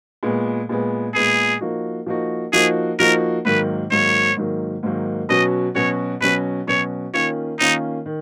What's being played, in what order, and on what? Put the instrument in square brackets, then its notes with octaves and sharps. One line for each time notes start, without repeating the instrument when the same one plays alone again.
[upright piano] A#2 G#3 B3
A#2 G#3 B3
[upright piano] A#2 G#3 B3 [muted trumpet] G#4
[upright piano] F3 A#3 D#4 F#4
F3 A#3 D#4 F#4
[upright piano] F3 A#3 D#4 F#4 [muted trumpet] G#4
[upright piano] F3 A#3 D#4 F#4 [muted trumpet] A#4
[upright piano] G#2 D#3 F#3 A#3 [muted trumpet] B4
[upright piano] G#2 D#3 F#3 A#3 [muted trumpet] C#5
[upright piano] G#2 D#3 F#3 A#3
G#2 D#3 F#3 A#3
[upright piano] B2 F#3 C#4 F#4 [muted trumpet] D#5
[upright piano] B2 F#3 C#4 F#4 [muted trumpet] C#5
[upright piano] B2 F#3 C#4 F#4 [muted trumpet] B4
[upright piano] B2 F#3 C#4 F#4 [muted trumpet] C#5
[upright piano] D#3 A#3 C#4 F4 [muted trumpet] C#5
[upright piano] D#3 A#3 C#4 F4 [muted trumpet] D#4
[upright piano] D#3